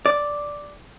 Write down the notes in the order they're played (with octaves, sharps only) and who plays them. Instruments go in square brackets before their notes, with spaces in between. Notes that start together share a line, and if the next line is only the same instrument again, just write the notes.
[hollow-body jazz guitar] D5